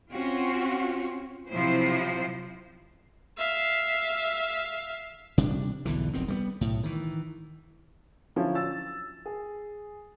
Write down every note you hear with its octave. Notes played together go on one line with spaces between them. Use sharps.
C4 C#4 F4 F#4
C3 F3 F#3 E4 C5
E5 F5
C3 G3 D4
B1 E2 D3 E3
F1 B1 D#3 C4
G3 G#3 B3
B1 A2
D#3 E3
D3 F3 F#3 C#4 E4
E6 A6
G#4